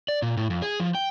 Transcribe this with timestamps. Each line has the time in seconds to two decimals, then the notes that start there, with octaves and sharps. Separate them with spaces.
0.08 D5
0.22 A#2
0.37 A2
0.50 F2
0.62 G#4
0.80 F3
0.95 G5